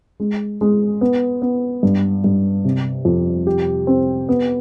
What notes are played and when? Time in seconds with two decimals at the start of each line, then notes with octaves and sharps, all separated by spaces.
0.20 G#3
0.61 G#3
1.01 B3
1.42 B3
1.83 G2
2.24 G2
2.65 C3
3.05 F2
3.47 G4
3.87 C4
4.29 B3